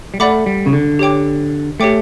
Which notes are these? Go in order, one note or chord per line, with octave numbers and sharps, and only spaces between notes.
G3
A3 A4 D5 F#5 B5 D6
G3
C#3
D3
G4 C#5 G5 D6
A3 G4 C#5 G5 D6